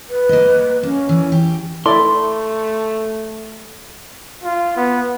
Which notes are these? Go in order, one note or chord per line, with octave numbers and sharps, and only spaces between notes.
B4
A#3 D#5
A#3 C#4
E3
G4
A3 E4 A4 D5 C6
F4
B3